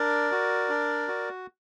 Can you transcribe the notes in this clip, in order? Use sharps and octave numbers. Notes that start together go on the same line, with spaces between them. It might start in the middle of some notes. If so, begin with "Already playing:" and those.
Already playing: D4 A#4 D5
F#4
D4
F#4